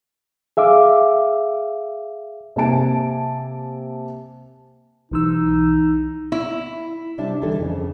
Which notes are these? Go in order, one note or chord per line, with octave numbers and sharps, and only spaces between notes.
G#4 E5 F5 D6
C3 A#3 G#5 A5 D7
B1 E3 D#4 E6
E4
C3 G3 D4 E5 A5
D2 D#3 E3 G3 D4 A4
F2 C#3